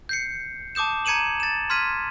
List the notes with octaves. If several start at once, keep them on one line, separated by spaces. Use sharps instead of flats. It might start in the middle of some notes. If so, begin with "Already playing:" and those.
G6 C7 C#7
A5 D6 D#6 G6 E7
A#5 G#6 C#7 D#7 E7 F#7
A6 E7
C6 F6 G#6 B6 D#7